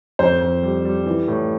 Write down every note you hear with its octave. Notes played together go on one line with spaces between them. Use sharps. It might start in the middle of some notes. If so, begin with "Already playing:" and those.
F2 C5
F2
G3
G3
E3
A2